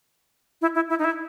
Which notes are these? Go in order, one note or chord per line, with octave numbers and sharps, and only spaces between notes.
E4
E4
E4
D#4
E4